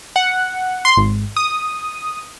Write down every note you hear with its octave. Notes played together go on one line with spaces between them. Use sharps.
F#5
C6
G#1
D#6